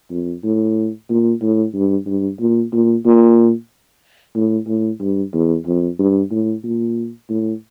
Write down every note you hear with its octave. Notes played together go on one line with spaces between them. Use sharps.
F2
A2
A#2
A2
G2
G2
A#2
A#2
A#2
A2
A2
G2
E2
F2
G2
A2
A#2
A2